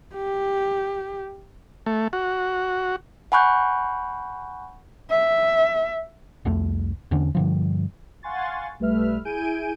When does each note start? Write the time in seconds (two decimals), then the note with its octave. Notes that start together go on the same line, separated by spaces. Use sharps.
0.15 G4
1.86 A3
2.13 F#4
3.32 F#5 G#5 B5 C#6 F#6 G6
5.10 E5
6.45 C2 F2 A3
7.11 E2 D3 C#4 D4
7.35 G2 D3 F3
8.23 F5 F#5 G#5 C6 C#6 A6
8.79 B1 G3 A3 B4 E5 F6
9.25 E4 G#4 G#5 G6 D7 D#7